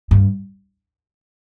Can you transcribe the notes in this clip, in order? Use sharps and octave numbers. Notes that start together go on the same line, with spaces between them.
G2